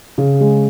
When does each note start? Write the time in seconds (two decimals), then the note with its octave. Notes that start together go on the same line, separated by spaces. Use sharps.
0.18 C#3
0.41 G#3